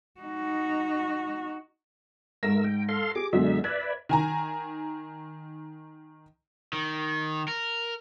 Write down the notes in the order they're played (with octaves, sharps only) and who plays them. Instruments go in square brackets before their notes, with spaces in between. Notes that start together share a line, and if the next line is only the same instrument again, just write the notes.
[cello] D#4 F#4
[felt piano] G#2 A#6 [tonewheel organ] A3 A#4 E6
[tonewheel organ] G5
A4 F5 C6
[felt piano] G4 G#4 [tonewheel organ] D6
[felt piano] F#2 B2 [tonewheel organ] D3 G#3 E5
[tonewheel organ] B4 D5 E5 [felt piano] G#6
[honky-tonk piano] D#3 G#5 A#5
[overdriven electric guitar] D#3
A#4